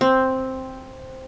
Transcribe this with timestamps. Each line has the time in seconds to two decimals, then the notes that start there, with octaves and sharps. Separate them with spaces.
0.01 C4